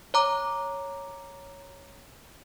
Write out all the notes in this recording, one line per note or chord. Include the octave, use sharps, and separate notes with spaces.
C#5 A#5 D6